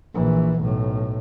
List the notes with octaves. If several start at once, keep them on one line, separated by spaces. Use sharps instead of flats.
A#1 E3
B1 A2